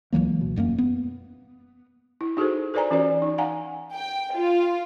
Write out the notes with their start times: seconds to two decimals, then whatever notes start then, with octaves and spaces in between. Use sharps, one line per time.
0.13 C#2 E3 F#3 A#3
0.41 B2
0.56 E1 F#2 G#3 A#3
0.78 B3
2.21 E4
2.37 D#4 F#4 G#4 A4 C5
2.74 A4 B4 C5 D5 G#5 A#5
2.91 E3 C#4 F4 F#4 B4 D5
3.22 D#4
3.38 F5 F#5 G#5 A#5
3.94 G5
4.35 F4